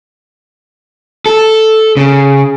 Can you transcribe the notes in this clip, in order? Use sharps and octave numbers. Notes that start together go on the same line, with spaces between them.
A4
C#3